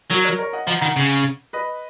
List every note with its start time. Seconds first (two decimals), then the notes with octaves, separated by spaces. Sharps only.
0.10 F#3 F#4 A#4
0.25 A#4 C#5
0.38 A#4 C#5
0.53 D#5 F#5
0.67 F3 F#5 A#5
0.81 D#3 F#5 A#5
0.96 C#3
1.53 B4 D#5